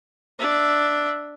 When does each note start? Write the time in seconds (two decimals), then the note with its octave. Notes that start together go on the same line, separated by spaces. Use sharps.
0.39 D4 E5